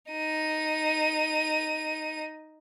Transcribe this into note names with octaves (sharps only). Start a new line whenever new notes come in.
D#4 D#7